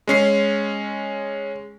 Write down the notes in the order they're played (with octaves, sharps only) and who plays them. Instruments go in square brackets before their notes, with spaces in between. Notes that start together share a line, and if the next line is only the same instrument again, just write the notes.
[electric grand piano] G#3 C#4 C7